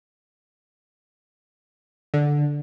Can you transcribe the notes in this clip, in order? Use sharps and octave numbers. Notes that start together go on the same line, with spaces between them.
D3